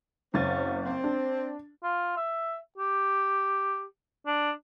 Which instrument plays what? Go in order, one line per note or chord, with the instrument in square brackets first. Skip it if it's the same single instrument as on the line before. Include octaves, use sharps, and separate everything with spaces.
[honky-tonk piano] F#1 A6 [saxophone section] C4 C#4
[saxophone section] C4
[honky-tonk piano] D4
[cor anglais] F4
E5
G4
D4